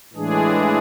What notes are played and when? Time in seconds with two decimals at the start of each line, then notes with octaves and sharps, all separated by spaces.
0.13 A2 E3 G#3 D4 G#4